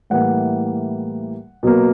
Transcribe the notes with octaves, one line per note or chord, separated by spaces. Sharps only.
A2 E3 G3 A#3 F#5
B2 F#3 A#3